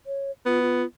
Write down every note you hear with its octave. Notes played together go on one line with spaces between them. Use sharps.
C#5
B3 F4
F4